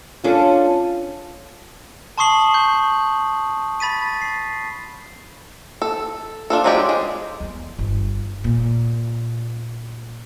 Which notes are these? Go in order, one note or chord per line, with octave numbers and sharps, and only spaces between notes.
C#4 D4 F4 A4
A5 C6 C#6 D#6 C7 F#7
C#6 G6
B5 A6 B6 D#7
C7
A4
D4 F4 A4
F3 F#3 G#3 D4 G4
G#3
E2
G1
A#2